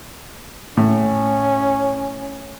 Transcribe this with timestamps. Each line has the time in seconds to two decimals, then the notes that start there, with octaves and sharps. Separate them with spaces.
0.77 A2 C#4